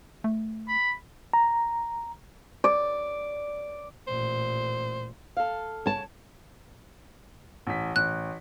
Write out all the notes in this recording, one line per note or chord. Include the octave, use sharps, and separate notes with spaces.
A3
B5
A#5
D5
A1 A#2 C5
A4 F5
C#3 C#5 A5
A1 B6
A1 F#6